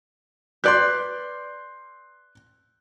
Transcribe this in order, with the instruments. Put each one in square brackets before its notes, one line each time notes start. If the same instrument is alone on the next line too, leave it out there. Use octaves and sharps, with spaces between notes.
[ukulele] B4 D5 [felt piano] C6 F#6 G6